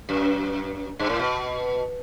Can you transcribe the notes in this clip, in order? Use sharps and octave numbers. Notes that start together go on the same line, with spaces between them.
F#2
G2
A2
B2